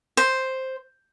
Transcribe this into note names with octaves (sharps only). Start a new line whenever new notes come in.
C5